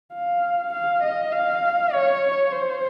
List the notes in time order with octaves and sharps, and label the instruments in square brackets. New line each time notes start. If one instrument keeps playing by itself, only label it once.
[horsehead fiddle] F5
F5
D#5
F5
C#5
C5